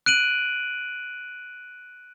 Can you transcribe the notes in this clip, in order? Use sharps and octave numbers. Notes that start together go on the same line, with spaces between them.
F#6 D7 D#7 F#7